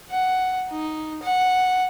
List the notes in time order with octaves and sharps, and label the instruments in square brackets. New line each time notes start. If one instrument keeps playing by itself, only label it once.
[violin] F#5
D#4
F#5